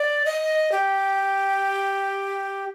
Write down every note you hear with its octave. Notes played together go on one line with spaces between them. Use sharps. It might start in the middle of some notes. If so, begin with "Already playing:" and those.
Already playing: D5
D#5
G4